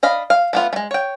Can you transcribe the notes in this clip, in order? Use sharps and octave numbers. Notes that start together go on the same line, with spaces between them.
D4 D#5 F5 B5
F5
A3 B3 F4
G#3 A3
C#5 G5